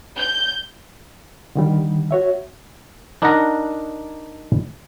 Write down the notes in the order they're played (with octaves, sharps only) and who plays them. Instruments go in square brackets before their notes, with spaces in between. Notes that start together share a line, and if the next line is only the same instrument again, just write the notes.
[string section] G6
[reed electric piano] D3 D#3 G3
F#4 C#5 E5
[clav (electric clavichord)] D4 D#4 A#4 D5 F#5 A#5